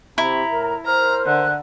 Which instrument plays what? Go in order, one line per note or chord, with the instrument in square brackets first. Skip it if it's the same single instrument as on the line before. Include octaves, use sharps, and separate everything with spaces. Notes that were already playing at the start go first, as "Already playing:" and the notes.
[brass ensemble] C3 [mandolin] E4 [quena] A#5
[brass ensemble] A2 A#4
[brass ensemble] A#4 C5 [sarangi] A#5 [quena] F6
[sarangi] D3 [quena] F#6